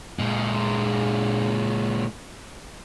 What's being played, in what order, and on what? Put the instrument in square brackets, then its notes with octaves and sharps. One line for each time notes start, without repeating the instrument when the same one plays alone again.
[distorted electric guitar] A#2 G#3